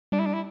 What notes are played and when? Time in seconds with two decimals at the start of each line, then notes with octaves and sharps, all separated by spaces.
0.12 G3 D4
0.19 E4
0.26 D4
0.34 E4